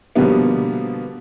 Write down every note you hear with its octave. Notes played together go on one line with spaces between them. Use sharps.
B2 D3 F3 G3 A#3 B3